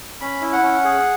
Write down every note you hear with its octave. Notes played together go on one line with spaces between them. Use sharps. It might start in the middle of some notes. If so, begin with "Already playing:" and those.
C#4 B5
E4
F#5
C#4
G#4